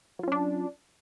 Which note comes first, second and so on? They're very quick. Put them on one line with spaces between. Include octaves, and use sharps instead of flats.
F#3 F4 C#4 D4